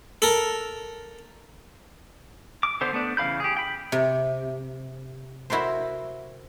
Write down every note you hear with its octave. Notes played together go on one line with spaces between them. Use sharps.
A4 A#4
D6
D3 B3 C5
A3 B3 D4
C#3 E3 F5 B5 G6
G4 G#4
G5 B5
C3
E4 F#4 A#4 C5